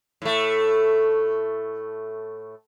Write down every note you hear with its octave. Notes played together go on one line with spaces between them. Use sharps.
A2 A3